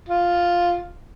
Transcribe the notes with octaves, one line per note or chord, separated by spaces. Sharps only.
F4